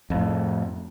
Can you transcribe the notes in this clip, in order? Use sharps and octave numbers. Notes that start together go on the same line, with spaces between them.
F2 A2